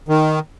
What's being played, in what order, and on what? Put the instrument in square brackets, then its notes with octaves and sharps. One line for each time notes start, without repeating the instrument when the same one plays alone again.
[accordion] D#3